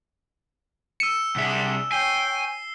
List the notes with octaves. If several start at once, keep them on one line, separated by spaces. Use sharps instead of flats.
E6 C#7 D#7 E7
C2 D4 G#4 E5 F#5
C#5 G5 G#5 C7 G7